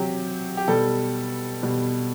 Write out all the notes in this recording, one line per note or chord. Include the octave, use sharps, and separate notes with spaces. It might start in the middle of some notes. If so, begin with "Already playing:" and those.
Already playing: C3 F#3 G4
G4
B2 G3 A4
B2 G3